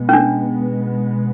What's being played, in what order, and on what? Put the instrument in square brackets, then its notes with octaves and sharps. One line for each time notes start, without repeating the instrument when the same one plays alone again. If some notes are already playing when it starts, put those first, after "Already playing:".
Already playing: [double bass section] B2 G#3 B3
[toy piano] C#4
D4